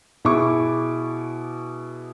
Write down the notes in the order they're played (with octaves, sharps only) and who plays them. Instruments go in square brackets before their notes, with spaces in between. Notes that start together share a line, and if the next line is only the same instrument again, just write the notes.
[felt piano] B2 E4 G#4 C#6 D6